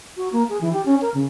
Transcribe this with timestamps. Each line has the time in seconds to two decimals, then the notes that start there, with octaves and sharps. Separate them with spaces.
0.17 F#4
0.32 A#3
0.49 G#4
0.61 E3
0.73 G4
0.85 C#4
1.01 A#4
1.14 C#3